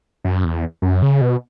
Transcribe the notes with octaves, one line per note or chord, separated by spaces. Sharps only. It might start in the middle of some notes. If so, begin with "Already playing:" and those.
F#2
E2
F#2
C#3
B2